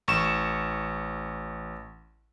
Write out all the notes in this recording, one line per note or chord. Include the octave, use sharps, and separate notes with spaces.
A1 C#6 E7